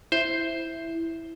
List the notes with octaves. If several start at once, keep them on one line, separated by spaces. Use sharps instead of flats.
E4 C5